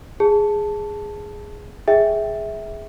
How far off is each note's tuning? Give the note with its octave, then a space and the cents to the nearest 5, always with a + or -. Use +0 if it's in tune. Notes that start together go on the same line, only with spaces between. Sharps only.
G#4 +0 A5 +0
G#4 +5 E5 -15 G5 +0